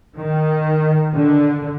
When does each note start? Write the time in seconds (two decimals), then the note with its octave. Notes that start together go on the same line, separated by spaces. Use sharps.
0.17 D#3
1.16 D3